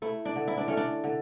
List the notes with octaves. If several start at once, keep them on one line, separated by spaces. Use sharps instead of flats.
A3 E4
D4
D3
E4
D4
A3 C#4
D4
D3